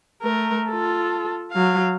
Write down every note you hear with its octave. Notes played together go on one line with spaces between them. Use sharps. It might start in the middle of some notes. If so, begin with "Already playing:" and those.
A3 A#4
F4 A4
F#3 F5